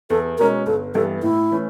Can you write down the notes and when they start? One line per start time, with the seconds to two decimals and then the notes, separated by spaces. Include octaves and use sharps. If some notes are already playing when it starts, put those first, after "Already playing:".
0.10 E2 A4
0.38 B2 G#3 C#4 A#4
0.66 G1 A4
0.95 G2 E3 G3 B3 A4
1.23 A2 E4
1.51 E3 A3 C#4